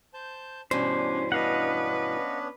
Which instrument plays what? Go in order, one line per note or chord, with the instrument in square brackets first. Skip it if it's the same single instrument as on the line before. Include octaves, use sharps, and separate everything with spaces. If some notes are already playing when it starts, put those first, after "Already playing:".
[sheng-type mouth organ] C5 A5 G6
[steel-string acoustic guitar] G2 B2 E3 [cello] C#4 [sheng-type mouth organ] D4 [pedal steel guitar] C5
[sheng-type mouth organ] B3 C#4 D4 [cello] B4 [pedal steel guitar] D#5 F5 F#5